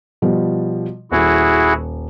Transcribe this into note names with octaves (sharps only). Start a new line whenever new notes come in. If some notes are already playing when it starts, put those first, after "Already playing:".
B2 F3 G3
D#1 E4 F#4 G#4